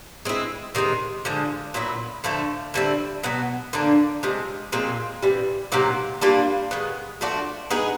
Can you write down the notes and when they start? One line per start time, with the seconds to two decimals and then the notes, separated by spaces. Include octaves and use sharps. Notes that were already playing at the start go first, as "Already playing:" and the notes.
0.25 G#3 C4 E4
0.75 C3 D#3 G#3 C4
1.25 D3 F3 G#3
1.74 A#2 F#3 B3 E4
2.24 D3 F3 A3
2.74 D3 G3 C4 E4
3.23 B2 F#3 B3
3.73 D3 F3 A#3 D4
4.23 C3 F3 G#3
4.72 A#2 F3 G#3 C4
5.22 C3 E3 G3
5.72 C3 D#3 F#3 A#3
6.21 G3 A#3 D4 F4
6.71 D#3 G#3 B3
7.21 F3 A3 D4 F#4
7.70 G#3 B3 D#4 G#4